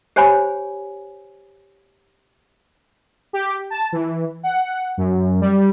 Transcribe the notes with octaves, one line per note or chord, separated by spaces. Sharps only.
G4 C5 C#5 G#5 B5
G4
A5
E3
F#5
F#2
G3